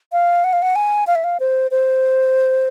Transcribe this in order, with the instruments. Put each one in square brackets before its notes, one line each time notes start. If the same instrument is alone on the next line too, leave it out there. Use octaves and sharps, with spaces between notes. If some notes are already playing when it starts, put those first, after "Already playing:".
[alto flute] F5
F#5
F5
F#5
G#5
F5
E5
F5
C5
C5